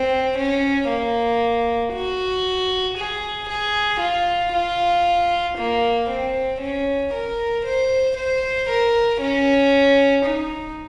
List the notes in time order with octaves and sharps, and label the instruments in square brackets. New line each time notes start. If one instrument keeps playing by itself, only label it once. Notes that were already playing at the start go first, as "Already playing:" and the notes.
Already playing: [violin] C4
C#4
A#3
F#4
G#4
G#4
F4
F4
A#3
C4
C#4
A#4
C5
C5
A#4
C#4
D#4